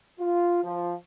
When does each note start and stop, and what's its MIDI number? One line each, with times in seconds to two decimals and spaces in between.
0.19 0.61 65
0.63 0.93 53